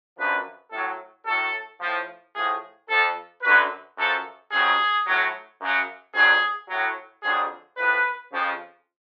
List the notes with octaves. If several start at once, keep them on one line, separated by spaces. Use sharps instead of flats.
F#2 D3 F3 B4
A2 F#3 A4
A2 F#3 A4
A2 F3
A2 F3 G#4
F2 F3 A4
F#2 D3 F#3 B4
F#2 F3 A4
F2 C#3 F#3 G#4
A2 F#3
F#2 C#3 F#3
F2 D3 F#3 G#4
A2 F#3
F2 D3 F#3 G#4
A2 F3 B4
F2 C#3 F3